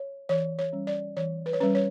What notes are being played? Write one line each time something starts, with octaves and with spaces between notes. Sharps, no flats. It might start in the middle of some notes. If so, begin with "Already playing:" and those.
Already playing: C#5
E3 C#5
C#5
G3 C#4
D5
E3 C#5
B4
C#5
G3 C#4 B4
C#5